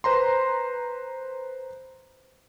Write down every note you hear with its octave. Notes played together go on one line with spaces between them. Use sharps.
B4 C5 A#5 C6